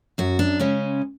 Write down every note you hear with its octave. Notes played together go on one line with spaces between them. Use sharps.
F#2 F#4
D4
C#3 G#3 C#4